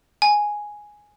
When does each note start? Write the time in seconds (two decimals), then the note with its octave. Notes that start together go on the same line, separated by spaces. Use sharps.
0.22 G#5